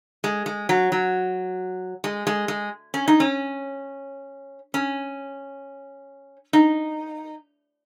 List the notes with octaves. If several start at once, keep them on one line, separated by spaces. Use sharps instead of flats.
G#3
G#3
F#3
F#3
G#3
G#3
G#3
C#4
D#4
C#4
C#4
D#4